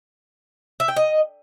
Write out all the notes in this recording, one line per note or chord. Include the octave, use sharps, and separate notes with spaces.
E5
G5
D#5